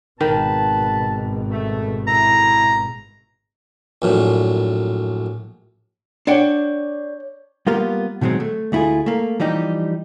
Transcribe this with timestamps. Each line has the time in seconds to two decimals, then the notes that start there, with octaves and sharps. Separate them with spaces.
0.21 G#1 B2 D#3 B4 A5
1.50 A3
2.07 A3 E4 A#5
4.02 A#1 F#2 A2
6.27 D4 C#5 D5 F#5 G5
7.67 G3 A#3 B3 F4 G4 A#4
8.21 B2 D#3 F#3 G#3 C4
8.40 A3
8.72 D2 A3 E4 F4 G#4
9.06 A3 A#3
9.40 E3 F3 G3 D#4 G4